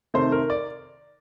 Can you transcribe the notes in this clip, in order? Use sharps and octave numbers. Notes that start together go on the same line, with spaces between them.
C3 D#3 A3 C4 C5
A#4
D5